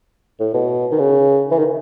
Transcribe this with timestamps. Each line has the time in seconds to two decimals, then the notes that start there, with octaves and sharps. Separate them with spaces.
0.40 A2
0.54 B2
0.91 D#3
0.99 C#3
1.51 E3
1.59 D#3